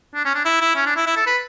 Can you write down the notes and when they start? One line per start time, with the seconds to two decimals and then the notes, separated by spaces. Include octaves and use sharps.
0.14 D4
0.25 C#4
0.34 D4
0.45 E4
0.61 E4
0.75 C#4
0.86 D4
0.96 E4
1.06 E4
1.16 A4
1.27 B4